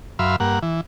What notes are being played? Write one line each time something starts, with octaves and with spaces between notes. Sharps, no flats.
F#2 E5 F5 B5 C6
G2 A#3 F#5
E3